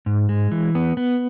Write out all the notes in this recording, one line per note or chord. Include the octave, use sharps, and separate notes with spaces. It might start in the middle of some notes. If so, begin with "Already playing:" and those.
G#2
G#3
E3
B3
B3